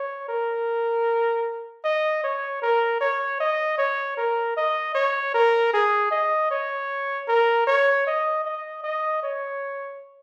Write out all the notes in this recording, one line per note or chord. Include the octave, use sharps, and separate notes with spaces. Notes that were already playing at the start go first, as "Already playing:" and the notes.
Already playing: C#5
A#4
D#5
C#5
A#4
C#5
D#5
C#5
A#4
D#5
C#5
A#4
G#4
D#5
C#5
A#4
C#5
D#5
D#5
D#5
C#5